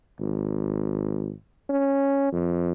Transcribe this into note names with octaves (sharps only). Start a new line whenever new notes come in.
G#1
C#4
F2